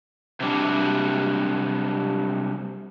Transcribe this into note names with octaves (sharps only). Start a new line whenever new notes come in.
C3 F#3 G3 D4